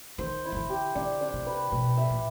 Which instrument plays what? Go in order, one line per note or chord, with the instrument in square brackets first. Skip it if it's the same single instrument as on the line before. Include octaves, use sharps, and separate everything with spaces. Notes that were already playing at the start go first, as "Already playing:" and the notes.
[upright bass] D#3 [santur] C5
[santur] E4
[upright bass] D#3
D3
[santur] G4
[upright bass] D3 [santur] D4
[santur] D4
[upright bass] C3
[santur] B4
[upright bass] B2 [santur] B4
[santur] E5
[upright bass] A#2